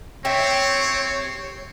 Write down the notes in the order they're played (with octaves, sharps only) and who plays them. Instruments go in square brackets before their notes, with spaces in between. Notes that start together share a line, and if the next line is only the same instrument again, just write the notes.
[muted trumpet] C4 [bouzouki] G4 E5 [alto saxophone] C#5